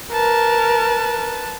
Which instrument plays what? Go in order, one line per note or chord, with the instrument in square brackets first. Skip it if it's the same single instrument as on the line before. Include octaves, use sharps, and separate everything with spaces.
[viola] A#4 [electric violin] B4 A5